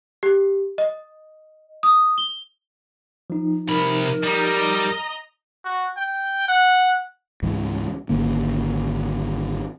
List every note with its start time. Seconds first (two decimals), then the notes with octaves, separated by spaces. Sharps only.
0.23 G4
0.78 D#5
1.83 D#6
2.18 G7
3.30 F3 D#4
3.68 C3 A#4 B5
4.24 G3 D#5 A#5
5.65 F#4
5.97 G5
6.48 F#5
7.42 C#2 G#2 E3
8.09 G#1 D3 A#3